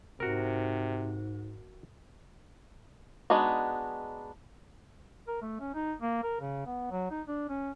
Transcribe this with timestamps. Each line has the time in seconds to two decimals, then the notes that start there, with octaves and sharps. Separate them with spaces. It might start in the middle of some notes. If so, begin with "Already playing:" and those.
0.20 G#2 C3 F#4 A#4
3.30 G#3 B3 D4 D#4 F#4
5.28 A#4
5.42 A3
5.60 C#4
5.75 D#4
6.01 A#3
6.23 A#4
6.40 C#3
6.66 B3
6.91 F#3
7.11 D#4
7.27 D4
7.49 C#4